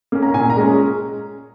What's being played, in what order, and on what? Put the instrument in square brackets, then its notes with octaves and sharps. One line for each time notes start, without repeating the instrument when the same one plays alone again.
[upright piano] A#3 C#4
A#5
A#2 G#5
A#5
G#3 C#4